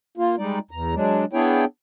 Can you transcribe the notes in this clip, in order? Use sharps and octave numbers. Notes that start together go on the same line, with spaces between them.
A#3 F4
G3 G#3 D#4 D5
E2 A#5
F#3 G#3 D4
B3 D4 E4 G#4 C#5 G5